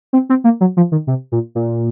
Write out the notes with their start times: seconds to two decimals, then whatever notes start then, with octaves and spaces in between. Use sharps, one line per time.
0.13 C4
0.29 C4
0.44 A#3
0.61 F#3
0.77 F3
0.92 D#3
1.07 C3
1.32 A#2
1.55 A#2